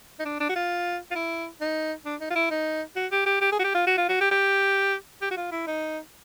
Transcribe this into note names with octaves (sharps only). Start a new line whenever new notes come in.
D#4
D4
D4
F#4
F4
F4
E4
D#4
D4
D#4
F4
E4
D#4
F#4
G4
G4
G4
G#4
F#4
G4
F4
F#4
F4
F#4
G4
G4
G4
F#4
F4
E4
D#4